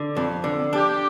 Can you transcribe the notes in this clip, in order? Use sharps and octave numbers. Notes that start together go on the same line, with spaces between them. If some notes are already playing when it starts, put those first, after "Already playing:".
Already playing: D3
F2
D3
D4 G4